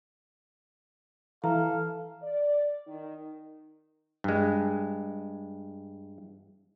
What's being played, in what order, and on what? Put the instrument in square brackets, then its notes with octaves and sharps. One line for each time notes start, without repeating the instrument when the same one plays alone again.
[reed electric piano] E3 [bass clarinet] A4 [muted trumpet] F5 [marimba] A#5
[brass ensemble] D5
D#3
[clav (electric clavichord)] G2 G#3